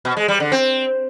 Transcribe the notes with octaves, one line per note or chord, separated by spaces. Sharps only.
B2
G#3
G3
D3
C4